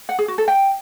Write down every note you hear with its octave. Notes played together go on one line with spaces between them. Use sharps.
F#5
G#4
F#4
A4
G5